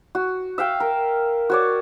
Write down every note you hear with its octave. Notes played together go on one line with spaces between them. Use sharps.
F#4
E5 F5 G5
A#4
F#4 C#5 D5